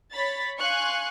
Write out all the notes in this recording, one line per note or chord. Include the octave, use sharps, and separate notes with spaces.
C#5 B5 A6
F5 G#5 C6 C#6 F#6 C#7